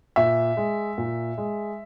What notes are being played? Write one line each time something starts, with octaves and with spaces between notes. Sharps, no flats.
A#2 E5
G#3
A#2
G#3